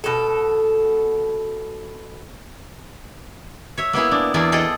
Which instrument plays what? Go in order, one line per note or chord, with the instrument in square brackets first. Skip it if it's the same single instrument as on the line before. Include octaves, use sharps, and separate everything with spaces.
[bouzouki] B2 A4
[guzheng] C#5 E5
A#3 B3 E4 G#4
D4
E2 D4 E4 F4 G#4 G#5
G#4 A4 D#5 G5